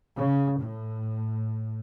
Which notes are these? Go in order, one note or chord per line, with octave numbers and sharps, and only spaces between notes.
C#3
A2